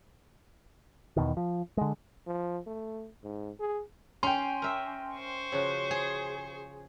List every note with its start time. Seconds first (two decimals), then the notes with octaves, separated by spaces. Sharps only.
1.17 E2 B2 D#3
1.37 F3
1.77 D3 G#3
2.27 F3
2.67 A3
3.23 G#2
3.60 G#4
4.23 C#4 G5 C6
4.62 A#4 E5
5.15 C5 C#6
5.52 C#3 F3 F#4
5.91 G#4